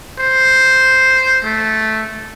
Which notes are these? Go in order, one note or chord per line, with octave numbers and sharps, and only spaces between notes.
C5
A3